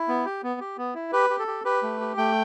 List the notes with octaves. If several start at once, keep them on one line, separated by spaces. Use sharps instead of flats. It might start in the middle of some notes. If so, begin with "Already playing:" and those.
Already playing: E4
B3
G4
B3
G4
B3
E4
G4 B4
G4
A4
G4
G4 B4
A3
G4
A3 G5